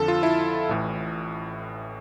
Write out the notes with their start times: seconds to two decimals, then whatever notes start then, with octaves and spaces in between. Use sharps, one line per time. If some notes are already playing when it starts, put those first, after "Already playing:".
Already playing: F2 D3 F3 A4
0.08 F4
0.23 E4
0.69 A1 A2 E3